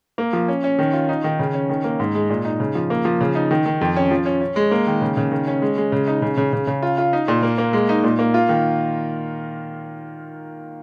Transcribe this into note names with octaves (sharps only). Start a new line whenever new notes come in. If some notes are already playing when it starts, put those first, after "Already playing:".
A#3
F3
C#4
C#4
D#3
F4
D#4
D#3
C#3
C#4
D#3
A#3
G#2
G#3
A#2
D#4
C#3
F3
A#3
F3
C#3
D#4
D#3
D#3
F2
C#4
F3
C#4
C#4
G#3
A#3
D#3
C#3
C#3
D#3
C#4
G#3
G#3
C#3
D#4
C#3
C#3
C#3
C#3
F4
F4
D#4
A#2
A#3
A#3
G#3
D#4
A#2
A#3
F4
D#3